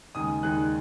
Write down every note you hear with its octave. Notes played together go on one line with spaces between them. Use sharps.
D#2 C#3 G#3 D#4 D#6
D#2 C#3 G#3 D#4 F#6